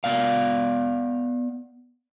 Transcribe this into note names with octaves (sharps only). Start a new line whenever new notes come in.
B3 D5 F5